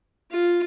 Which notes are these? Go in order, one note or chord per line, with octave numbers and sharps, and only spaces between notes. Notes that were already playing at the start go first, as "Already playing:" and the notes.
F4